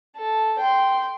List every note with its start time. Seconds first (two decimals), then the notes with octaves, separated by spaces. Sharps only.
0.17 A4
0.59 G5 C6